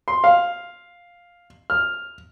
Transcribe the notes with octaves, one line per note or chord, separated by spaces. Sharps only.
C6
F5
F6